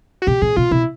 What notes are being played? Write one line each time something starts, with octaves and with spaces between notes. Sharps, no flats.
F#4
B2 G4
A#2 G#4
B2 F4
B2 E4